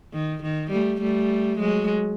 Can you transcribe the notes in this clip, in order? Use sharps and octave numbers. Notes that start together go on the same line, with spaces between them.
D#3
D#3
G3 A3
G3 A3
F#3 G#3